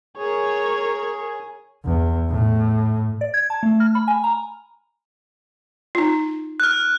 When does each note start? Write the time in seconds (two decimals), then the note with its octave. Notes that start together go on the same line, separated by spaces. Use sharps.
0.17 G#4 A#4 C#5
1.85 E2
2.30 A2
3.21 D5
3.34 G#6
3.50 A5
3.63 A3
3.80 F6
3.95 B5
4.08 G#5
4.24 A#5
5.95 D#4 F4
6.60 F6 F#6